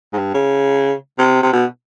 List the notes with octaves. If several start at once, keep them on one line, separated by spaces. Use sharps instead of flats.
G#2
G2
C#3
C3
C3
B2